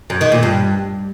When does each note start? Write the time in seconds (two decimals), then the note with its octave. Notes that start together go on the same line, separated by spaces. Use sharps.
0.10 F#2
0.21 D#3
0.32 A#2
0.43 G2